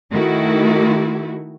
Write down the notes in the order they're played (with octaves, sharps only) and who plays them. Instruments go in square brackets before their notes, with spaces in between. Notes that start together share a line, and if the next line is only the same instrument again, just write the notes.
[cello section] D#3 A3 E4 F#4